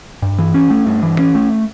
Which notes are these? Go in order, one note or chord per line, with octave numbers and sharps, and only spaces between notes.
G2
E3
C#4
A3
G2
E3
C#4
A3